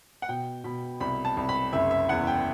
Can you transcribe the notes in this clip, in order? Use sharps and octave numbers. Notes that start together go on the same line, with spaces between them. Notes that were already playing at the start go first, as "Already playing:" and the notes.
F#5
B2 G5
B2 B5
C2 B5
A5
C2
B5
F#1 E5
E5
E2 F#5
G5